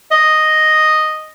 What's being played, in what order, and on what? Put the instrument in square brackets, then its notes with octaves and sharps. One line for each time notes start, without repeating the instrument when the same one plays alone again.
[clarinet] D#5